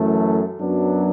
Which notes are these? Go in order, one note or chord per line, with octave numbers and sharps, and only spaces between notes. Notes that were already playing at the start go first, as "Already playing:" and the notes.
Already playing: F#2 E3 A3
F#2 F#3 B3 D4